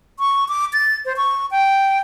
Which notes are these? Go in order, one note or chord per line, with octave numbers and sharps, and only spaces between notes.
C#6
D6
A6
C5
C#6
G5